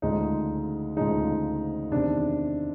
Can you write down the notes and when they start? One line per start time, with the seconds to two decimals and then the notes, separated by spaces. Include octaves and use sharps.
0.02 D2 C#3 F3 G#3 D#4
0.97 D2 C#3 F3 G#3 D#4
1.91 E2 C3 D#3 D4